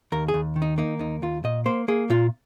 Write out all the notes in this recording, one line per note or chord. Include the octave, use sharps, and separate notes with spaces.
D#2 A#4
G#4
D#2
D#3
D#4
A#3 D#4
D#2 D#4
D#2 F4
A#2 D#5
A#3 C5
A#3 G#4
A#2 F4